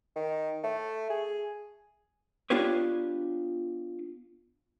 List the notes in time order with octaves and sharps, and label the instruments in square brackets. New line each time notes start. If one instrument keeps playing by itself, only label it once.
[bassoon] D#3
A3
G#4
[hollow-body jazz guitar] B3 D4 F4 G4 B4 C#5